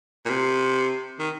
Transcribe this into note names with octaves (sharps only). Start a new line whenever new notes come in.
A#2
C3
D#3